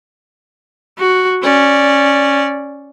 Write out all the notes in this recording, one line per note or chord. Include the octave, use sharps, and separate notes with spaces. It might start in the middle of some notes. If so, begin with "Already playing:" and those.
F#4
C#4 D5